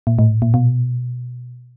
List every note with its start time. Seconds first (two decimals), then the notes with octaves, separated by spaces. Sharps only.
0.07 A#2
0.19 A2
0.42 A#2
0.54 B2